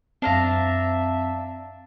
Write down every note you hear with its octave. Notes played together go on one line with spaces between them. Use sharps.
F#2 C4 D4 E5 F5 A#5